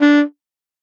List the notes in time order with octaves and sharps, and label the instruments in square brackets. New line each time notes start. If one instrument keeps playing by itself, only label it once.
[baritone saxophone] D4